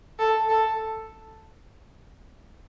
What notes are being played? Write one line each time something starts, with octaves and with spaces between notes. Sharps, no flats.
A4
A4